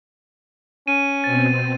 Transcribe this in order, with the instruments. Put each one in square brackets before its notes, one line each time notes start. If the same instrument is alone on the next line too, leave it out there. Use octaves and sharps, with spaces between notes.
[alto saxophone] C#4 [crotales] D#7
[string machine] B2 C4 [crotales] A6